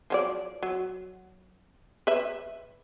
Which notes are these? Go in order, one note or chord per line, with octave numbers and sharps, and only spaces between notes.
F3 F#3 D5
F#3
B4 E5